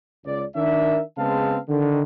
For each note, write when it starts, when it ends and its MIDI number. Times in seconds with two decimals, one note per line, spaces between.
0.25 0.44 37
0.25 0.44 74
0.55 1.00 51
0.55 1.00 62
0.55 1.00 70
0.55 1.00 76
1.18 1.58 49
1.18 1.58 56
1.18 1.58 59
1.18 1.58 60
1.18 1.58 77
1.18 1.58 81
1.68 2.03 50
1.68 2.03 51